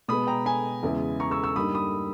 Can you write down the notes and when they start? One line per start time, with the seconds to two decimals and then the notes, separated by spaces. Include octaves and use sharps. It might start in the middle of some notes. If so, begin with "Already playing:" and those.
0.08 B2 G#3 B3 B5 D#6
0.27 G5 A#5
0.45 G#5 B5
0.83 E2 C#3 G#3 B3 E4
1.20 A#5 C#6
1.31 C#6 E6
1.44 C#6 E6
1.56 G2 G3 A#3 D#4 B5 D#6
1.74 B5 D#6